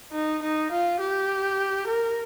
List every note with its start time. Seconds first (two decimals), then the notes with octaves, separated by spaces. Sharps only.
0.12 D#4
0.42 D#4
0.72 F4
1.00 G4
1.88 A#4